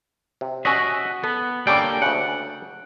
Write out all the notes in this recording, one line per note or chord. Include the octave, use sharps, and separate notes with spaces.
C3
C#4 F#4 C#5 D#5 E5
B3 A4
G3 A#3 C#4 D4 A4 G5
D2 C#3 F#5